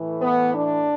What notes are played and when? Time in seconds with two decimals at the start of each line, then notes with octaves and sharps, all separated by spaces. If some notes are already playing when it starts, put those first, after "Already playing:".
Already playing: A2 E3
0.22 B3
0.54 D4